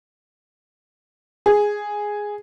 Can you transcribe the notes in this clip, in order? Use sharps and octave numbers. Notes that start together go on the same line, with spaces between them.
G#4